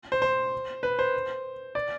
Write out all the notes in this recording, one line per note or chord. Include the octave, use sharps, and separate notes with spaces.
C5
C5
B4
C5
D5